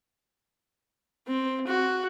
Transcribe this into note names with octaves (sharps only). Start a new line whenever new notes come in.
C4
F#4